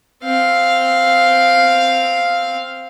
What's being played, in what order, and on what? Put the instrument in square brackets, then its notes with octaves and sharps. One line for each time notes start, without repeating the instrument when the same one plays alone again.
[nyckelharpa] C4 F5